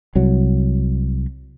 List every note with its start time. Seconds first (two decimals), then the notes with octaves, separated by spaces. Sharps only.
0.15 C2 F#3